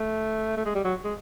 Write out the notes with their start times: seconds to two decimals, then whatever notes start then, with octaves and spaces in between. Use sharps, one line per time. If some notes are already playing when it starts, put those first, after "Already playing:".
Already playing: A3
0.57 A3
0.65 G#3
0.75 G3
0.84 F#3
1.04 G#3